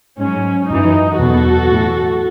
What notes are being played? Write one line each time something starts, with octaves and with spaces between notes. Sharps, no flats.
G#2 F#3 C#4
F#2 E3 D#4
E2 B2 F#3 F#4 A4
A2 E3